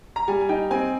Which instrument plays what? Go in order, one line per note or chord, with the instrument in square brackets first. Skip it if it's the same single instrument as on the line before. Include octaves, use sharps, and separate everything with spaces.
[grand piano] A#5
[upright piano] G3 [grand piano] G#5
[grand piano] G#5
[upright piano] D#4 [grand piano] G5
[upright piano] C4 [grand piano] G#5